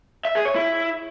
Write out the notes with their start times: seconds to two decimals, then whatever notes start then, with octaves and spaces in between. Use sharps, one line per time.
0.25 E5
0.35 G#4
0.45 C#5
0.55 E4